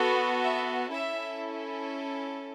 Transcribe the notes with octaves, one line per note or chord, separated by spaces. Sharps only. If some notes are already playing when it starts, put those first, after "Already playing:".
Already playing: B3 F#4 A4
E5
C#4 E4 A4 E5